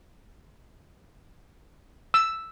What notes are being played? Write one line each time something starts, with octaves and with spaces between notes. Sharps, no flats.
E6